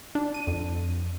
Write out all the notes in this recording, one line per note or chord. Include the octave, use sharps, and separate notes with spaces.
D4
D#7
F2